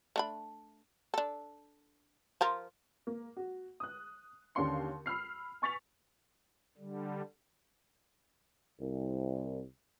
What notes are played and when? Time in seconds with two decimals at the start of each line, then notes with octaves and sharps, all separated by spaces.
0.16 A3 D4 B5
1.14 D4 A4
2.41 F3 F4 A#4
3.07 A#3
3.37 F#4
3.80 D#6 F#6
4.55 D#2 D3 C#4 F5 C6 C#7
5.06 B5 E6 F6 C7
5.62 G#5 C#6 A6 B6 F7
6.78 D3 G3
8.80 C2